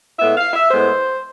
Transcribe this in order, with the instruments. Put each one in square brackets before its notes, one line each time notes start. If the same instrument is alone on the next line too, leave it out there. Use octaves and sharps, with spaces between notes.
[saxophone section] A2 G#3 B3 E5
F5
E5
A2 G#3 B3 C5